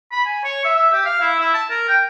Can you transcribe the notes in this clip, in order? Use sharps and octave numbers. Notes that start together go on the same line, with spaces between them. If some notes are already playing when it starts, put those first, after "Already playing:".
B5
G#5
C#5
E5
E5
G4
F5
E4
E4
A5
A#4
G5